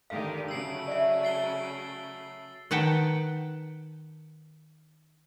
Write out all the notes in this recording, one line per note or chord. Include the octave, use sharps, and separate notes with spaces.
D3 D#3 G4 F5
C#3 F#3 A3 E6 C7
D5 E5
A6 C7 G7
D#3 B4 F#5 G5 A5